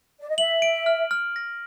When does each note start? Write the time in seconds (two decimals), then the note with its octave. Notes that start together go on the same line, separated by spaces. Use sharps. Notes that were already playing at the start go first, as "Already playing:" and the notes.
0.20 D5
0.29 D#5
0.37 E5 F#7
0.62 D7
0.86 F6
1.11 F6
1.36 A#6